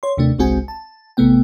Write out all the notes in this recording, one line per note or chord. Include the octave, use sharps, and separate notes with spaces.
C#5 C6
D#2 C3 A3 D4
G1 C2 G#3 C4 F#4 G#5
A5
A1 C3 A3 B3 G5